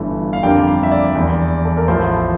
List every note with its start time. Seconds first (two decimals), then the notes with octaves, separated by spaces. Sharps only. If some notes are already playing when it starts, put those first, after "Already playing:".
Already playing: G1 G2 E3 A3
0.33 F5
0.43 F2 D3 G3 A#3 D4 G5
0.67 F5
0.83 E5
0.91 D5
1.15 E2 E3 A#3
1.65 A4
1.77 A#4
1.88 A1 A2 F3 A3 C5